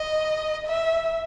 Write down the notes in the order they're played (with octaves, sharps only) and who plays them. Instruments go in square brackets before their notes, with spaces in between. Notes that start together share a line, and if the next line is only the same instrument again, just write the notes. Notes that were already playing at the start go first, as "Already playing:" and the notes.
Already playing: [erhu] D#5
E5